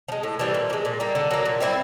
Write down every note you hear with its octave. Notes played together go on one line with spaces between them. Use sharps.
F3
G#3
A2
E3 G3 C4
A#2
F3
G#3
A#2
G3 A#3
D3
F#3 A#3
A#2
G3 C4 E4